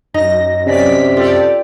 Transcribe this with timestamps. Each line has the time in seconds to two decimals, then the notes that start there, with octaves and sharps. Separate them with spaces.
0.14 F#2 D#4 A#6
0.66 C3 C#4 D5 B6
1.17 F4 G4 A4 D5